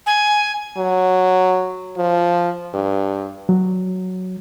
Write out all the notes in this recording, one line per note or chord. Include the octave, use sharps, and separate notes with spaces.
G#5
F#3
F3
G2
F#3